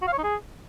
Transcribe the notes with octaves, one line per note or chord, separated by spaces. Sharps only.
F#4
F5
C#5
D#4
G#4